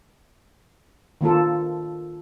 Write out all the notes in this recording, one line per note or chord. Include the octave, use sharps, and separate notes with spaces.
D#3 A#3 F4 A4